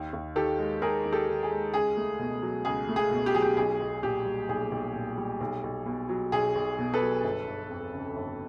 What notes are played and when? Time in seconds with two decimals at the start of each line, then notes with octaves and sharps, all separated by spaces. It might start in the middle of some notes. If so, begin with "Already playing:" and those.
Already playing: D#2
0.13 D#2
0.36 D#3 G4 A4
0.59 G#3
0.82 D#2 G#4 A#4
1.05 D#2
1.12 G4 A4
1.28 D#3
1.43 G#4
1.51 G#3
1.74 C#2 G#4
1.97 A3
2.20 B2
2.42 F#3
2.65 C#2 G#4
2.89 A3
2.96 G#4
3.11 B2
3.26 G4
3.34 F#3 G#4
3.42 G4
3.57 B1 G#4
3.80 B1
4.03 A#2 G4
4.25 G3
4.49 B1 G#4
4.71 B1
4.95 A#2
5.18 G3
5.41 B1
5.63 B1
5.86 B2
6.09 F#3
6.32 B1 G#4
6.55 B1
6.79 B2
6.94 A4 B4
7.01 F#3
7.24 G1
7.47 G1
7.70 F2
7.93 C#3
8.16 G1